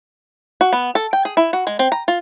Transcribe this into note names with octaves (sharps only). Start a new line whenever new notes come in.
F#4
B3
A4
G5
G#4
E4
F#4
G#3
C4
A#5
F4